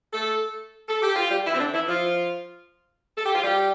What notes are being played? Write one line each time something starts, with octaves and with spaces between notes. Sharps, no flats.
A3 A4
A4
G4
F4
G3 G4
E3 E4
C4
D3 D4
E3 E4
F3 F4
A4
G4
F4
G3 G4